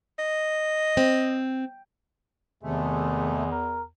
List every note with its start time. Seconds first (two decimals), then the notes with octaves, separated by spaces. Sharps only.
0.19 D#5
0.97 C4
2.63 E2 C3 D#3 G#3 A3
3.52 A#4